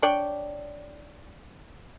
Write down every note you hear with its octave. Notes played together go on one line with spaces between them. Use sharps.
D4 C#5 D5 G5